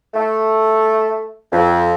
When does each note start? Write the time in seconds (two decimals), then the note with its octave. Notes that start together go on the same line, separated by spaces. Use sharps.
0.14 A3
1.52 F2